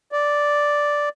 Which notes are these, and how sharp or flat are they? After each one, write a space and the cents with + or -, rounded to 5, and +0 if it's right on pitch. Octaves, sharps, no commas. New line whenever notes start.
D5 -5